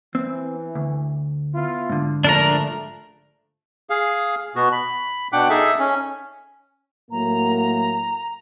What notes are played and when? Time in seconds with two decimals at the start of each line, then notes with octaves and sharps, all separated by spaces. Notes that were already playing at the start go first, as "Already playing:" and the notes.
0.15 E3 C4
0.75 D2
1.55 B3 E4 F4
1.90 G#2 D3
2.24 A#1 F3 A3 D4 A#4 A#5
3.90 G#4 F5
4.56 B2 B3 F#4
4.72 B5
5.33 B2 D4 F#5 G5 D6 F#6
5.50 D#4 G#4 A4 E5
5.79 C#4
7.11 A2 F#3 A#3 A#5